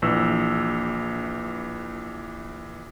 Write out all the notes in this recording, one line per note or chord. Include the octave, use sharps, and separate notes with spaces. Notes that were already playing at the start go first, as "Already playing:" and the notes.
A#1 E3 E6